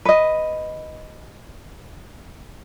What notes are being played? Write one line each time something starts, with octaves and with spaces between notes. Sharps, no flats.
B4 D#5